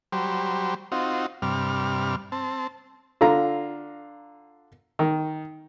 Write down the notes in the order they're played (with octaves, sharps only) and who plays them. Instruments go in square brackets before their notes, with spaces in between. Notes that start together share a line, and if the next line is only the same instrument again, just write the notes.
[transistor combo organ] F#3 G3 G4 C5
C4 D#4 F4 F#4
G2 C3 G3 F6
C4 A5
[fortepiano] D3 F4 A#5
D#3